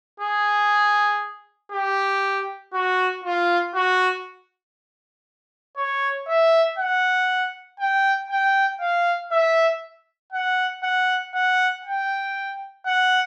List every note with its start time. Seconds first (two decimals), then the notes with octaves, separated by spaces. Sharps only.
0.20 G#4
1.72 G4
2.73 F#4
3.24 F4
3.75 F#4
5.77 C#5
6.28 E5
6.78 F#5
7.80 G5
8.30 G5
8.81 F5
9.32 E5
10.32 F#5
10.83 F#5
11.34 F#5
11.85 G5
12.86 F#5